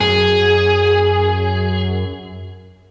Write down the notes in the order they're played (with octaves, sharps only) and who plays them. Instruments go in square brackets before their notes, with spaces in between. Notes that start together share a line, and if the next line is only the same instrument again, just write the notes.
[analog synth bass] F#2 [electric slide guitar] G#4